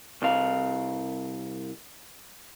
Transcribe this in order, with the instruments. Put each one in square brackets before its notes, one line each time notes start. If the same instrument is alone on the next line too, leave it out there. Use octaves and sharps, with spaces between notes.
[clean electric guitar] C2 F5